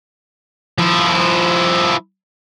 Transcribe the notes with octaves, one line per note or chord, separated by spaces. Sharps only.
F3 E4